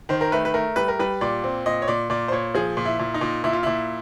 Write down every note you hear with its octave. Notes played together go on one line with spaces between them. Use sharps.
D#3 C5
A#4
A3 B4
B4
A3 A#4
G3 B4
A#4
G3 B4
A#2 D5
C4
A#2 D#5
C#5
A#2 D5
A#2 D5
C5
A#2 C#5
F3 G#4
A#2
E4
A#2
D#4
A#2
A#2 E4
F4
A#2 E4